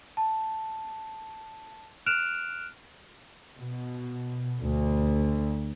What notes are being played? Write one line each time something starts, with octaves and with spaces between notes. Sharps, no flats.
A5
F6 F#6 D7 E7 F7
B2
D2